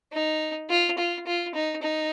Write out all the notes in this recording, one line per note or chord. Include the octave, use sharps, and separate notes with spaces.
D#4
F4
F4
F4
D#4
D#4